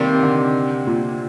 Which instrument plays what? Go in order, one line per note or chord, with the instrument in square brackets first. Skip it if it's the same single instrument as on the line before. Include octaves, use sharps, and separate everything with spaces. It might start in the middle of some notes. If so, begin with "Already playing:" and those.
Already playing: [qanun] C3 G3 A#3 [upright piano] D#3
[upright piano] D3
A#2